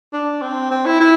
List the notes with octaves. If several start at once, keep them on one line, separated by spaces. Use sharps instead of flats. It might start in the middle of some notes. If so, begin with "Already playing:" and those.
D4
C4
C4
E4
E4